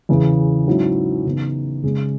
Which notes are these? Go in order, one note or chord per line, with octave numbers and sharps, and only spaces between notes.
E2 C#3 E3
G#2 F#3 C#4 E4
C#3 E3 B3 D#4
C#3 G#3 C#4 G#4